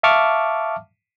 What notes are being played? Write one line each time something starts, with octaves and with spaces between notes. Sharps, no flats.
E5 F5 A5 C#6 D6 F6